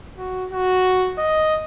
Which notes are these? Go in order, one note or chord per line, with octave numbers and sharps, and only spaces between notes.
F#4
F#4
D#5